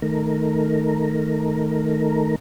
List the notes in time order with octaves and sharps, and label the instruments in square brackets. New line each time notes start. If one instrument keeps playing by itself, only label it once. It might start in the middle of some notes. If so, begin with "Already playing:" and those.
[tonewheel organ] D#3 A3 A#4